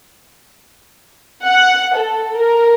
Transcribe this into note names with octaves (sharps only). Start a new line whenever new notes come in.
F#5
A4
A#4